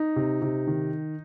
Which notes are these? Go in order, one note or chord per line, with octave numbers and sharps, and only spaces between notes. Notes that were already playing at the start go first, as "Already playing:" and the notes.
Already playing: D#4
C3
C3
D#3